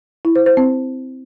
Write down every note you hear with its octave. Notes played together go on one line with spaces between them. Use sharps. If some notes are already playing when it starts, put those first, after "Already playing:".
E4
C5
C5
C4